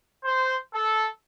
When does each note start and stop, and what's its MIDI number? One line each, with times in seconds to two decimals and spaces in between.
0.25 0.57 72
0.74 1.08 69